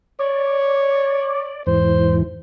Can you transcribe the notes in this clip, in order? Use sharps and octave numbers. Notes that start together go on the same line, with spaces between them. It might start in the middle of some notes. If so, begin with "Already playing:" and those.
C#5 D5
E2 G#2 E3 C5